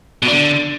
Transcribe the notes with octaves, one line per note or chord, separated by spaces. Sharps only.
B2
D4
D3